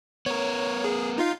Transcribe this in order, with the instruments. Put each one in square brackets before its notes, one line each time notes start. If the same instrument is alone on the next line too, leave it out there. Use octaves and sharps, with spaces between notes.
[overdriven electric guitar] B3 A#4 [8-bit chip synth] C#5
[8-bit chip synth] G#4
D#4 F4 F5